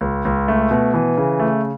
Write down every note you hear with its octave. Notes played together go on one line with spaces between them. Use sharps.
C#2
C#2
A3
B2
E3
C#3
A3